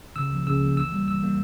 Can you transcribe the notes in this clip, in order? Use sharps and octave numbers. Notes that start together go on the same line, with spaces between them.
C#3 E6
F3 A#3
C#3 E6
F3 A#3
E3 E6
G3 A#3
E3 E6
G3 A#3